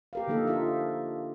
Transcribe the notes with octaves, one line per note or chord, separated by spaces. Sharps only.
G4 A#4 F5
D3 F3 A#3 D#4 A4
D#4 F4 E5